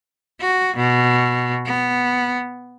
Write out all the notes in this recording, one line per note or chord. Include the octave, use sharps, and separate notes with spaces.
F#4
B2
B3